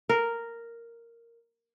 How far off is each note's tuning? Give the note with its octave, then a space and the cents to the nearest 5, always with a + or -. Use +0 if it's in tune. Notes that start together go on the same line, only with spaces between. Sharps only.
A#4 -5